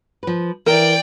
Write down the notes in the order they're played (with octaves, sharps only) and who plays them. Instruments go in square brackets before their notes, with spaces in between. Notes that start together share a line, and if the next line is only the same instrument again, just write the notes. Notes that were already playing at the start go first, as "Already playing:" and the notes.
[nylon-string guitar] F3 B4
[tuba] E3 [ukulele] A#4 [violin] D5 G5 [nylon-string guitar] E5